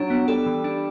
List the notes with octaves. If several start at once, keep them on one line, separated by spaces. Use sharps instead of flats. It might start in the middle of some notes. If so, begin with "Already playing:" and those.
Already playing: F#3 D4
B3
G3 A4
E3
D4